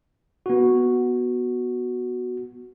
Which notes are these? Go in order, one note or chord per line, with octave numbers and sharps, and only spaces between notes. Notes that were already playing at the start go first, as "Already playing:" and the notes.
B3 F#4